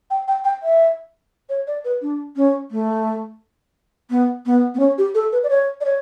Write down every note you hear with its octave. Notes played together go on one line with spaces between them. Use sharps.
G5
G5
G5
E5
C#5
D5
B4
D4
C#4
A3
B3
B3
B3
C#4
G4
A4
B4
D5
C#5
D5
C#5